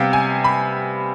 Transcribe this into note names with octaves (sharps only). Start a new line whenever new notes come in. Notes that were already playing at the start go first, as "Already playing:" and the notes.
Already playing: C3 G3 B3 F5 G5
G#5
B5